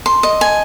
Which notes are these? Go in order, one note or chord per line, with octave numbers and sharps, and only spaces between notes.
C6
D#5
G#5